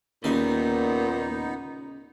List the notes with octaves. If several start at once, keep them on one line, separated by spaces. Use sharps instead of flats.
D#2 A#2 C#3 B3 D#4 E5 F5